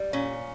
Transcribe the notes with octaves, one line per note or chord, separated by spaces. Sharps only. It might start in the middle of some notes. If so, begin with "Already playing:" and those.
Already playing: G3
A#2 C#4